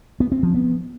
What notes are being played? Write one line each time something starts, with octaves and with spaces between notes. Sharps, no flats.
B3
C4
F3
B3